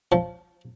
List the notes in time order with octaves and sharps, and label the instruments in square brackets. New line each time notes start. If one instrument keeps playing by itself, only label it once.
[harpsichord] F3